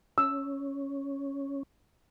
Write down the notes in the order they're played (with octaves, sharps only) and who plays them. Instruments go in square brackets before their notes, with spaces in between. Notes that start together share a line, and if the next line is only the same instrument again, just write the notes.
[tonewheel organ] C#4 [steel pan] E6